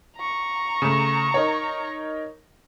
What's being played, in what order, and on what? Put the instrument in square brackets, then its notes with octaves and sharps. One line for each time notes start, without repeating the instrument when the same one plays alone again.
[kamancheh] A#5 C#6
[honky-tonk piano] C#3 A3
D#4 A#4 C#5